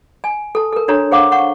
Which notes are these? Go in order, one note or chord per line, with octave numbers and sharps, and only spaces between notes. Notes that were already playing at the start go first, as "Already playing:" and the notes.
G#5
A4 A5
A4 A#4
D4 F#4 A4 C#5 A#5
G#4 C5 F5 F#5 D6
F#5 C#6